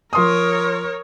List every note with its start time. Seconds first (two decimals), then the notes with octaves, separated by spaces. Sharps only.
0.13 F3 A#4 C#5 C6 D#6